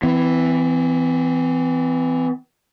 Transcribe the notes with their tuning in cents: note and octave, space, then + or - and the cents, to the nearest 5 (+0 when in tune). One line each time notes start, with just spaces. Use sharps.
E3 +0 C4 -40